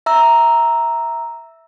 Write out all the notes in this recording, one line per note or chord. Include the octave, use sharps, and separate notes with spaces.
E5 A#5 E6